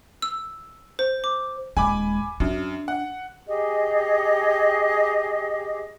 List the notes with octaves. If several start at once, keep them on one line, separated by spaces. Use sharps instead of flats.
E6
C5
D6
D#1 G#3 G#5 B5 D6
F#2 D4
F#5
G4 G#4 D#5